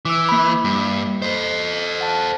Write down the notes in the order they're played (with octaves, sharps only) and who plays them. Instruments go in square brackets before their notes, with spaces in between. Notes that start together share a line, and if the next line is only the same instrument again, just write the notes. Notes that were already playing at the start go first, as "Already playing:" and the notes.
[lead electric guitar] E3 [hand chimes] D6 E6
[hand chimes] A#3 B5
[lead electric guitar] G2
[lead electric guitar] A4 C5 [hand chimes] D#5
[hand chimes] F#5 A5